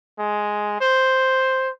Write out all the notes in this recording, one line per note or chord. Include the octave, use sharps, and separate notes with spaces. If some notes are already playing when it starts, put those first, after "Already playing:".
G#3
C5